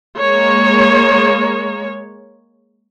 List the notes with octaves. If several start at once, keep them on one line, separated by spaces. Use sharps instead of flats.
G#3 A#3 C#5